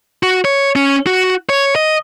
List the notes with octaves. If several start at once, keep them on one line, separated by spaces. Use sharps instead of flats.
F#4
C#5
C#4
F#4
C#5
D#5